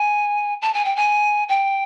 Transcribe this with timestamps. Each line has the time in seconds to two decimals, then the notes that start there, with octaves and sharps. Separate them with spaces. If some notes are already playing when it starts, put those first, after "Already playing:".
Already playing: G#5
0.62 A5
0.74 G#5
0.85 G5
0.96 G#5
1.49 G5